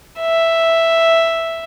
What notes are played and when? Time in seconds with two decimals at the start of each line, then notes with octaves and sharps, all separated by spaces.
0.21 E5